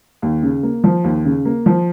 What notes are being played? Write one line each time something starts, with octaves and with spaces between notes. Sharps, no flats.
D#2
C#3
A#3
F3
D#2
C#3
A#3
F3